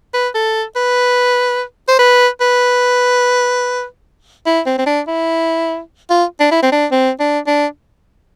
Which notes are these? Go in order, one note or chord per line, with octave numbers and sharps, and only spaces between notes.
B4
A4
B4
C5
B4
B4
E4
C4
C4
D4
E4
F4
D4
E4
C4
D4
C4
D4
D4